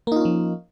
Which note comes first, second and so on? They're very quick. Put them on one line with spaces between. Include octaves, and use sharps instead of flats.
A#3 D#4 F4 C#4 F3